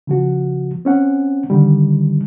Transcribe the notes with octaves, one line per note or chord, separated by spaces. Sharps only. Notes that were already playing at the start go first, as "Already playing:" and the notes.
C#3 F3 F#4
C4 C#4 F#5
D3 D#3 G3